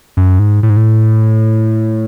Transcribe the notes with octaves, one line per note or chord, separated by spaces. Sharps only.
F#2
G#2
A2
G#2
A2